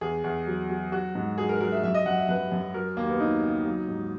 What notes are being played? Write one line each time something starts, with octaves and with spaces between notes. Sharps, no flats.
E2 G#4
E2
F#3
F#3
F#3 F#4
G#2
F#3 G#4
A#4
F#3 A#4
E5
F#2 E5
D#5
F#2 F#5
E5
F#2 B4
F#2
F#3 A#4
D#2 A#3
B3
F#3 D#4
C#3
F#3
G#2